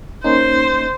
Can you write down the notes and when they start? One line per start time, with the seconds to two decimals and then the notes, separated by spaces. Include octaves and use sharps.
0.24 A#3 C#4 D#4 C5